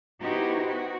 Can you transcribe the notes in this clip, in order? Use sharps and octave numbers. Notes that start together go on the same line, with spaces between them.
B3 D#4 E4 F#4 G4 C5
F#4